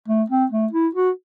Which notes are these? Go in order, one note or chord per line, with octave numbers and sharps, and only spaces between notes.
A3
C4
A3
E4
F#4